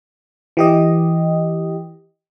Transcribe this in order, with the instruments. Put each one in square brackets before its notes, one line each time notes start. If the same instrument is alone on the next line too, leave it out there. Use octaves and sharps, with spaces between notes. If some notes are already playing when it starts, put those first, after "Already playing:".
[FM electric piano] E3 G4 D#5